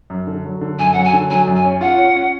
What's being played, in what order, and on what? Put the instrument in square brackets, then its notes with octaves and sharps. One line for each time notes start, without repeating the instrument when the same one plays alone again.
[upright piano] F#2
D3
F#3
D3
[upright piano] F#2 [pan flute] G#5
[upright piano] F#3 [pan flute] F#5
[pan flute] G#5
[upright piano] D3
[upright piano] F#3 [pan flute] G#5
[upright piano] F#2
[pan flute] G#5
[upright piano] C#4
[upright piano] F4 [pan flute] F#5
[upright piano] C#4
C#4